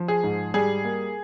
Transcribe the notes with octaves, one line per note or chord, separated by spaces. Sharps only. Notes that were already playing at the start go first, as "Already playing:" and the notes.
Already playing: F3
G#4
G#2
G3 G#4
A#3